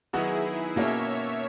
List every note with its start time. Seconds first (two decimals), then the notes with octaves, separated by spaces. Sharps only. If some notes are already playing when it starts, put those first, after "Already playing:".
0.13 D#3 F#3 B3 D#4 E4 F#4 G#4
0.76 B2 A#3 C#4 C#5 E5